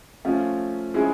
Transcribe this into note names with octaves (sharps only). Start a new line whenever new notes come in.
F3 A3 C#4 F4
F3 G#3 C#4 E4 G#4